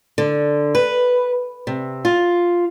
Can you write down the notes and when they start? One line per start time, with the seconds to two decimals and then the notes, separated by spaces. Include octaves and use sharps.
0.18 D3
0.75 B4
1.67 C3
2.05 F4